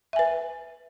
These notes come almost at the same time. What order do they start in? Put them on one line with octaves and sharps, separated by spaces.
E5 G#5 B4